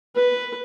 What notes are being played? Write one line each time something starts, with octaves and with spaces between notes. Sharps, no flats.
B4